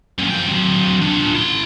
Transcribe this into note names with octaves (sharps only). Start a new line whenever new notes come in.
F#2 A#2
F3 G5
F#3 C4
D4 F4
E4 C6